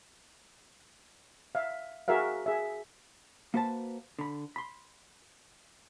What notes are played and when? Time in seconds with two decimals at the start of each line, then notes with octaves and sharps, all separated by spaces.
1.55 E5 F5
2.08 F#4 G#4 A#4 E5 F5
2.46 G#4 E5
3.54 A#3 F#4 B4 C5 A5
4.19 D3 B5
4.56 B5 C6